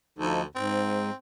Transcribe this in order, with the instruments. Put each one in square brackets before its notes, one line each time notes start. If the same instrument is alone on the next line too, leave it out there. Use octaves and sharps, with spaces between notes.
[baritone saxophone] D2 [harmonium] F3 D#4 A4
[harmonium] G#2 [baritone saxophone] C4